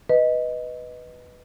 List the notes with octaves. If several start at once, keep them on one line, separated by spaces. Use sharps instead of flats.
B4 D#5